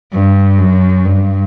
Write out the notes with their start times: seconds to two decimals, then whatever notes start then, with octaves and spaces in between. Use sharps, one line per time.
0.12 G2
0.59 F#2
1.05 G2